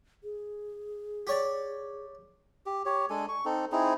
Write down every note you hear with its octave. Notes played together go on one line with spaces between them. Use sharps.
G#4
G4 C#5 D5
G4
G4 C#5
G#3 D4 A4 G#5
C#6
C4 D#4 A4
C4 D#4 E4 G#4